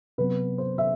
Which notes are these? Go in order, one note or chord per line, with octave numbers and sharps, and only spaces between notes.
C3 F#3 B3 B4
C5
E5